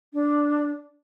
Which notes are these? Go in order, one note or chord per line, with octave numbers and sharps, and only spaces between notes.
D4